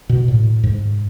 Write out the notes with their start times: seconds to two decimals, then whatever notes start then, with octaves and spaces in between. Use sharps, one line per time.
0.09 B2
0.28 A2
0.63 G#2